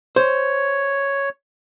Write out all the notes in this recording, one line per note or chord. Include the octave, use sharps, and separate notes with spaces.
C5 C#5